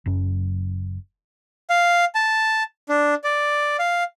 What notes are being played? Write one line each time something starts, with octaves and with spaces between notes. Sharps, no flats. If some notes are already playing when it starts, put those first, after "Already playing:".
F#1 F#2 C#4
F5
A5
D4
D5
F5